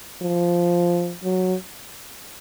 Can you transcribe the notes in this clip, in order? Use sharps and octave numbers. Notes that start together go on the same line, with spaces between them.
F3
F#3